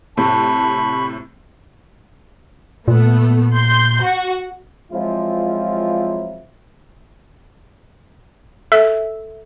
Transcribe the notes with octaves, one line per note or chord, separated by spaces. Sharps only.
A2 C3 A5 B5 C#6
A#2 A3 B3
C6 G6
F#4
F3 F#3 G#3 C4 E4 F4
A4 E5